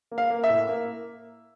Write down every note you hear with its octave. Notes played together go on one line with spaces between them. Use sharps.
A#3
F5
A#3
E5
A2
A#3